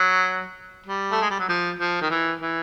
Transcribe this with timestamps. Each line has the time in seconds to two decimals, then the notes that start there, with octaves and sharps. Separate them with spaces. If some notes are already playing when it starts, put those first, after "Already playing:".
Already playing: F#3
0.86 G3
1.12 A3
1.21 G#3
1.30 G3
1.39 F#3
1.49 F3
1.79 F3
2.01 D#3
2.10 E3
2.41 E3